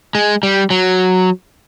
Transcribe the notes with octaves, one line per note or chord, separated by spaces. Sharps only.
G#3
G3
F#3